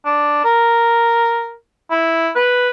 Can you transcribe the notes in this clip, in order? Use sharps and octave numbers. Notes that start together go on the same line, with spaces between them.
D4
A#4
E4
B4